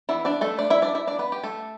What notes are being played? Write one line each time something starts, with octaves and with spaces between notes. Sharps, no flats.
E3 B3 D4 E4 E5
D4 D5
A3 A4
D4 D5
E4 E5
D4 D5
E4 E5
D4 D5
B3 B4
G4
A3 A4